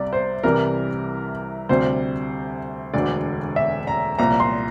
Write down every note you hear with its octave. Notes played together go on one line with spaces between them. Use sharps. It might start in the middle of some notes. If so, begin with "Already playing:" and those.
Already playing: C2 C3 G3 D5
C5
C2 C3 E3 G3 A#4
D2 C3 G3 C5
E1 D2 D3 D5
E5
A#5
C2 A#2 F3 A#5
C6